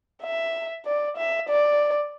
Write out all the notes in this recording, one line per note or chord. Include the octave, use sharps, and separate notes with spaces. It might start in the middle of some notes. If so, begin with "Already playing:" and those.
E5
D5
E5
D5